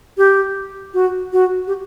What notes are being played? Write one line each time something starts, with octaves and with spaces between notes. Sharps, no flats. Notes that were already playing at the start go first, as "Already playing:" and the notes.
G4
F#4
F#4
G4